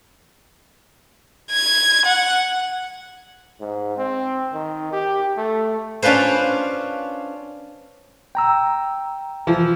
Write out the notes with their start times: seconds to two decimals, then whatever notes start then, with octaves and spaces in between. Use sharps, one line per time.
1.51 G#6
2.05 F#5
3.61 G#2
3.97 C4
4.54 D#3
4.92 G4
5.37 A3
6.02 C#4 D4 F4 B4 C5
8.35 G5 A#5 E6
9.47 E3 F3